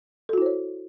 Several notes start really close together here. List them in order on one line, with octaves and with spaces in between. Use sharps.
A4 F#4 E4 C5 C#5